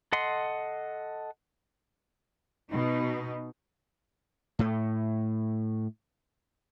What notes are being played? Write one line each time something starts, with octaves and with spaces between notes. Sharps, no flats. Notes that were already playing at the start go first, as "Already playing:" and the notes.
A4 D#5 F#5 C6
B2 D#4
A2 A3